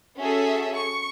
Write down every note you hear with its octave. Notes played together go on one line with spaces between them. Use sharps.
C#4 F#4 G#4 A4 E5
C#6